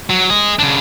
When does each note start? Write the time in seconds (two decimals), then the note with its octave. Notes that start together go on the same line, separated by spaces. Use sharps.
0.10 F#3
0.30 G#4 D#5
0.59 C#3 D4